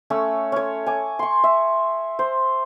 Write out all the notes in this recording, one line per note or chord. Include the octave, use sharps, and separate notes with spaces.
A3 C#4 C#5 E6
C#4 C#5
G#5 D6
C6 C#6
E5
C5